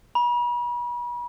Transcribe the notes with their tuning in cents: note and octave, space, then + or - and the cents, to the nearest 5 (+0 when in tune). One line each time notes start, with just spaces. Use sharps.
B5 -40